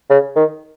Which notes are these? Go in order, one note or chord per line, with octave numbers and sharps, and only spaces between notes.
C#3
D#3